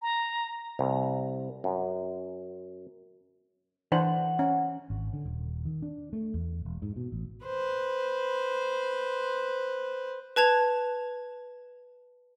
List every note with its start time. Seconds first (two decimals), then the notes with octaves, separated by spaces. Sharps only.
0.02 A#5
0.79 C2
1.64 F#2
3.92 E3 D4 C5 F#5
4.39 C#4
4.90 G#1
5.13 D3
5.25 D#1
5.65 D#3
5.82 D4
6.13 A3
6.34 E2
6.65 E1
6.82 G#2
6.96 B2
7.12 A1
7.45 B4 C5
10.36 B4 A5 G#6 F7